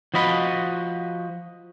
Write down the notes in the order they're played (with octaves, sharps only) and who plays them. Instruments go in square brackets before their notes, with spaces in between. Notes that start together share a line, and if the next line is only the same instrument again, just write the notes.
[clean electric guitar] F3 F#4 D#5 B5